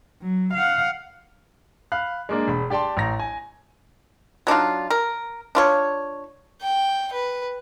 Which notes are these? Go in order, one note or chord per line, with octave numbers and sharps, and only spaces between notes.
F#3
F5 F#5
F5 B5 F#6
G#3 A#3 D4
E1 B5
G4 D5 G5 A5 C6
A1 A#5 A#6
G#5
F#3 D4 D#4 F4
A#4
D4 F4 C#5
G5
B4